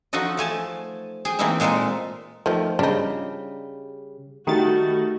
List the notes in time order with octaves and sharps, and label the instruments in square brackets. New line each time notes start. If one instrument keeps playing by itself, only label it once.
[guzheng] F3 D#4 F#4 A4 D#5
F3 A3 G#5 A5
G#4 G5 G#5
E3 A3 A#3 C4 D#4 E4
A#2 G#3 A#3 D#4 A4 E5
[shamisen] D#3 A3 [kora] F3
[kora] C#3 G3 [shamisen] D4 D#4
[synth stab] D#3 A6 [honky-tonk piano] G3 A3 D#4 [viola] F#4